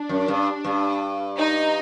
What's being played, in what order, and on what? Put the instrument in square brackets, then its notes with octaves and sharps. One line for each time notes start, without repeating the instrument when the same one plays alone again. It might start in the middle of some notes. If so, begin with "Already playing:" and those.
Already playing: [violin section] D4
[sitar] F#2
G2
G2
[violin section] D#4